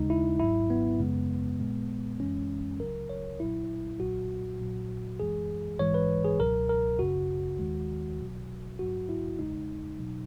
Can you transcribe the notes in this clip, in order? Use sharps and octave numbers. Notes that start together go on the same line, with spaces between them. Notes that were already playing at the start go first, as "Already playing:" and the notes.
Already playing: D#2 C#3 G#3 D#4
E4
G#1 G#2 F#3 E4
B3
F#2 C#3 G#3
B1 A#2 G#3
G#1 F#2 E3 G#3 C#4
C#2 C#3 F#3 A#4
C#5
B1 A#2 F#3 E4
B1 A#2 F#3 F#4
A#1 A#2 F#3
F#2 E3 G#3 G#4
A#1 G#2 E3 G#3 C#5
B4
G#4
C#2 B2 F#3 A#4
A#4
G#1 F#2 C#3 F#4
D#2 D#3 G#3
B1 B2 F#3
A#1 G#2 F#3 F#4
E4
E2 C#3 G#3 D#4
B2 F#3